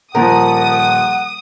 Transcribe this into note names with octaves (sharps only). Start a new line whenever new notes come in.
D#1 F3 A#4 F#5 D#6